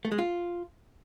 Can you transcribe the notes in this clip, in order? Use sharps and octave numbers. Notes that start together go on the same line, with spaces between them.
A3
G#3
F4